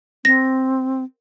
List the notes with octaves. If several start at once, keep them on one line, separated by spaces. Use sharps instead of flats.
C4 A#6